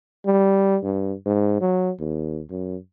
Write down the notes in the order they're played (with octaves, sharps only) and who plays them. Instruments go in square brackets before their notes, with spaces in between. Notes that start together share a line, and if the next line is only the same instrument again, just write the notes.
[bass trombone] G3
G2
G#2
F#3
D#2
F#2